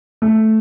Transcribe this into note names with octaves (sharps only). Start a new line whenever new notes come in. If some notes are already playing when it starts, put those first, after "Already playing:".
A3